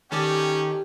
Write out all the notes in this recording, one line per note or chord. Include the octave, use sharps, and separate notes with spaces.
D#3 C#4 G4 A4 D5